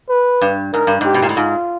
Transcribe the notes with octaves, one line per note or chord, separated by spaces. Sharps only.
B4
G2
G#2 A#4
G2
G#2 G4
B2
A#2
A2
G#2 F4